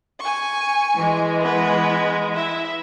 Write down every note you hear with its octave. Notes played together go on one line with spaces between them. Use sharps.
G#5 C#6
E3 G#3
B3 B4
E4 E5